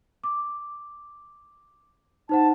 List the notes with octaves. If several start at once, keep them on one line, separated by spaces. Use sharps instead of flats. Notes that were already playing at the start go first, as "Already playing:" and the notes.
D6
D#4 C5 F#5 A5